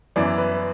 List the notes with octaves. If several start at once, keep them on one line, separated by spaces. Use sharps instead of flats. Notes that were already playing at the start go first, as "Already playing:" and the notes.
F#2 E3 B3 E4 D5
B4